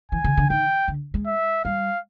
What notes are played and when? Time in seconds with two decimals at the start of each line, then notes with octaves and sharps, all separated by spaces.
0.12 E3 G#5
0.24 C#3
0.37 D3
0.50 D#3 G5
0.88 D3
1.14 G#3
1.26 E5
1.65 G3 F5